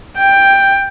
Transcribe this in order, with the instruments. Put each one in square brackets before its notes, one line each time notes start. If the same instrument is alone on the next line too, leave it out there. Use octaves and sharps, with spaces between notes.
[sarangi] G5